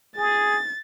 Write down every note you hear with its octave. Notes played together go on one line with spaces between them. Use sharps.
G#4 A6